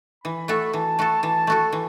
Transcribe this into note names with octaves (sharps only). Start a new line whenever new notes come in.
E3 B5
A3 F#4 A4
E3 A5
A3 F#4 A4
E3 A5
A3 F#4 A4
E3